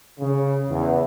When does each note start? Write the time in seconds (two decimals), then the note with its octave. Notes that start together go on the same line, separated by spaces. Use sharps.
0.19 C#3
0.68 E2